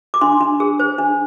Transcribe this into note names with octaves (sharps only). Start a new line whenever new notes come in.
D6
D4 C6
D4
G#4
C5
D4